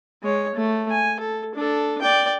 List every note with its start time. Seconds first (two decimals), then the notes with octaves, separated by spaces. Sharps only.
0.23 G#3 C#5
0.55 A3
0.90 G#5
1.20 A4
1.55 D4 A4
2.01 D5 G5